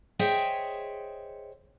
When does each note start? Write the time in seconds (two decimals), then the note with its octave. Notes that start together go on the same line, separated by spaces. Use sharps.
0.19 G#4 C5 C#5 D#5 E5 G5